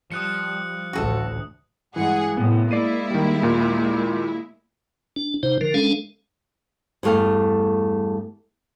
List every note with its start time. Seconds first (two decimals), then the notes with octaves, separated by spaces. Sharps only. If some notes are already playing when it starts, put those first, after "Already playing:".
0.12 F3 G3 D#6 F#6 C#7
0.93 A1 D2 A2 F#4 G#4 A4
1.96 G2 E3 G#3 G#4 F#5
2.37 A2 C3 B3
2.71 G#3 A#3 E4 D5 C7 D#7
3.11 D#3 G3
3.42 D#2 A#2 F4
5.16 D4
5.43 C3 D#4 C5
5.61 D3 F3 A#4
5.74 G#3 C#4 D4 A4 F5
7.03 E2 G2 A3 F5 G#5